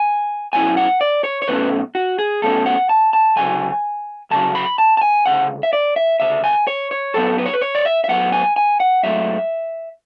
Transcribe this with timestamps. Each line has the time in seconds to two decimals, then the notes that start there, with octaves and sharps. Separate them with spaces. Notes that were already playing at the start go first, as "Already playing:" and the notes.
Already playing: G#5
0.53 B1 B2 F#3 C#4 E4 G#5
0.77 F#5
1.01 D5
1.24 C#5
1.42 C#5
1.47 B1 B2 A3 C#4 B4
1.95 F#4
2.19 G#4
2.42 B1 B2 A3 C#4 A4
2.66 F#5
2.89 A5
3.13 A5
3.36 D2 C#3 F#3 G#5
4.31 D2 C#3 F#3 A5
4.55 B5
4.78 A5
4.97 A5
5.02 G#5
5.26 D2 C#3 F#5
5.63 E5
5.73 D5
5.96 E5
6.20 D2 C#3 E5
6.44 G#5
6.67 C#5
6.91 C#5
7.14 A2 F#3 B3 A4
7.38 B4
7.46 C#5
7.53 B4
7.61 C#5
7.75 D5
7.85 E5
8.04 E5
8.09 A2 F#3 B3 F#5
8.32 G#5
8.56 G#5
8.80 F#5
9.03 G#2 F#3 A3 E5